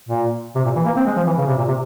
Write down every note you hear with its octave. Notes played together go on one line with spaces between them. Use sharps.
A#2
C3
A#2
E3
A#3
C4
G#3
F3
E3
C#3
C3
A#2
C3